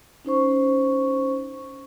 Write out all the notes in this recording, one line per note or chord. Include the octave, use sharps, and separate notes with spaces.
C#4 D#4 C5 C#6